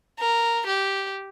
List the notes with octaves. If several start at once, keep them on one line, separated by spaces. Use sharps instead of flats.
A#4
G4